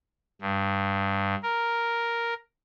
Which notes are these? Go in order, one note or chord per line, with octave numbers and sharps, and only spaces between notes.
G2
A#4